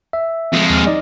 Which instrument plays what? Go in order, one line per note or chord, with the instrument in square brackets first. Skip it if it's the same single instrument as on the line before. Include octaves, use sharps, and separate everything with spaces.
[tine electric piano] E5
[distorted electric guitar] F2 G#3
[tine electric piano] D#2 F6
D#4 D5 D#5